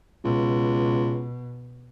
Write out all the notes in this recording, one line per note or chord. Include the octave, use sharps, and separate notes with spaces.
C#2 B2